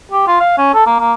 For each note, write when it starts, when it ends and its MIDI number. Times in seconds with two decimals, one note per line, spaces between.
0.11 0.25 67
0.27 0.37 65
0.40 0.54 77
0.58 0.72 61
0.74 0.83 69
0.87 0.95 58
0.99 1.13 58